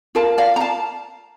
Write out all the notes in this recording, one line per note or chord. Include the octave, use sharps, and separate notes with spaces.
F4 A#4 F5 A5
D5 F5
A#5
F5 A5